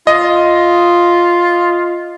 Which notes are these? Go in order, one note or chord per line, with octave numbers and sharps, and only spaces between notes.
F4 D#5